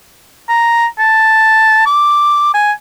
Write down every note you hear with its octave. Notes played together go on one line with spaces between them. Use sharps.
A#5
A5
D6
G#5